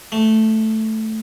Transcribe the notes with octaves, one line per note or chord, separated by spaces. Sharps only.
A3